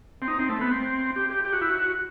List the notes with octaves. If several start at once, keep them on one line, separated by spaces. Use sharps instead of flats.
C4
D#4
C4
A3
B3
C4
G4
G4
G4
F#4
E4
F#4